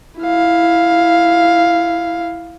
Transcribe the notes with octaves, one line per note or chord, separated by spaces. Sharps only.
E4 F5